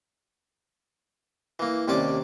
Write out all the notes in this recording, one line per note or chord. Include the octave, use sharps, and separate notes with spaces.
E3 A#3
D#2 C3 C#4 D5 D6